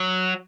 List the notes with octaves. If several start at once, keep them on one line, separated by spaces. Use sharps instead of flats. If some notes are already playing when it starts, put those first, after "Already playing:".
Already playing: F#3